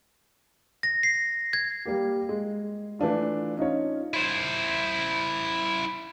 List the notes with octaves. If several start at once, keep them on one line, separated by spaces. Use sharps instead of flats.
A#6
C7
G#6
G3 A#3 G4
G#3
E3 A3 D4 F4
C#4 D#4 F4 C#5
E4 C5